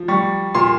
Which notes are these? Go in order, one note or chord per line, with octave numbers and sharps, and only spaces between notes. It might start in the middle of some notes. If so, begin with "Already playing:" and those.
Already playing: F3
G3 C#6
A#2 C6